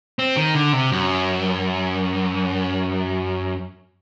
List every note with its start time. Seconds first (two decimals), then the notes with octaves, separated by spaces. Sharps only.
0.19 C4
0.37 D#3
0.55 D3
0.73 C3
0.92 F#2